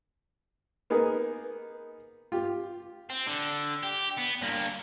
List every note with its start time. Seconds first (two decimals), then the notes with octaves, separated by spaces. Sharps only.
0.90 A#3 B3 D#4 G#4 A#4
2.32 F4 G4
3.10 C4
3.27 D3
3.83 G4
4.18 B3
4.42 G2 A#3